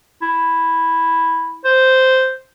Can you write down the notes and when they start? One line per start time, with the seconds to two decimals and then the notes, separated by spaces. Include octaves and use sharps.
0.22 E4
1.64 C5